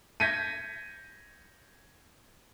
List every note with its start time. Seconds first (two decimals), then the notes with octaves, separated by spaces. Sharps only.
0.20 G6 G#6 A#6 B6 C#7 D#7